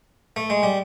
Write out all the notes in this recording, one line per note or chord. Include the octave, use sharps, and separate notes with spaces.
A3
G#3
G3